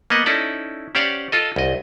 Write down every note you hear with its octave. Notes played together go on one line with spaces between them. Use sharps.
A#3 B3 D#5 F#5
C#4 D#4 E4 A4 D5
C#4 G4 C5 D5 F5 F#5
F4 A4 D#5
C2 D#5